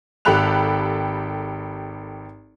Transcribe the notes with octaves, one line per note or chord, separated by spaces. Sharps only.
G#1 G4 A4 B5 F#6 F7